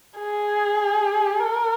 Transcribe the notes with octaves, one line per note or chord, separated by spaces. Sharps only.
G#4
A#4